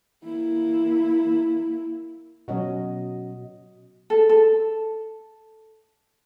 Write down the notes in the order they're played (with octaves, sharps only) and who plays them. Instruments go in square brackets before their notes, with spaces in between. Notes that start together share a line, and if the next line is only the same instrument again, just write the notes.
[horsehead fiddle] A#3 E4
[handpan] B2 D#5 [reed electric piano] F#3 C#4 F#4
[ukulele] A4
A4